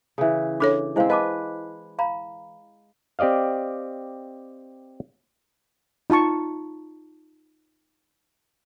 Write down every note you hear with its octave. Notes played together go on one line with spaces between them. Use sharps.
C#3 E3
D4 A4 C#5 D6
G#3 C4 E4 C5 F5
B4 D#5 A5 D6
F5 A#5 B5
C4 G4 D5 D#5 F5
D#4 F4 A5 C#6